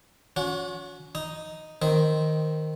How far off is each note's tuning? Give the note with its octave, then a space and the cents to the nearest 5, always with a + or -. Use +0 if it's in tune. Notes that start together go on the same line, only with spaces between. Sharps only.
C#4 +30 F#4 -40 F#5 -20
D#4 +0 D#6 +0
D#3 +0 C4 +0 D#5 +0